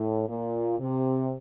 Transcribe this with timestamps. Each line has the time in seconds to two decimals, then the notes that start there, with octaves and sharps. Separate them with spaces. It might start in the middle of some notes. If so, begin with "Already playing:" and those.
Already playing: A2
0.28 A#2
0.80 C3